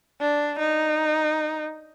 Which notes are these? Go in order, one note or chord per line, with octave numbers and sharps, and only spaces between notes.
D4
D#4